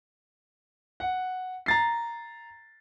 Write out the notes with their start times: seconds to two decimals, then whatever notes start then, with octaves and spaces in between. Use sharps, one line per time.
1.00 F#5
1.66 A#5 A6 C7